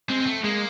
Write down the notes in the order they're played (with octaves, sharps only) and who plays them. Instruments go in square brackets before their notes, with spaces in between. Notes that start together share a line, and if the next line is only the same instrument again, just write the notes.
[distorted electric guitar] G#3 [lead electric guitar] C4
[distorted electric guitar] G#3
A3
[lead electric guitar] G#3 [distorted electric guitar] A#3